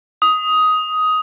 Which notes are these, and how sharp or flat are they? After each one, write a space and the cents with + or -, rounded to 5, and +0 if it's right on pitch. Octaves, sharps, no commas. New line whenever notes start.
D#6 +10